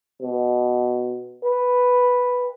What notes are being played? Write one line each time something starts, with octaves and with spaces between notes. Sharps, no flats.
B2
B4